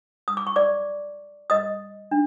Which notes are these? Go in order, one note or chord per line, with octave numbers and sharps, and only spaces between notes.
D#6
D6
C#6
D5 D6
D#5 D#6
D4